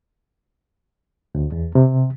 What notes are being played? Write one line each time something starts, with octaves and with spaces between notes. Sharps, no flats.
D2
E2
C3